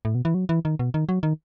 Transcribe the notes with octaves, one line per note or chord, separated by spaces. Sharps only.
A2
B2
E3
F#3
E3
D#3
B2
D#3
F#3
D#3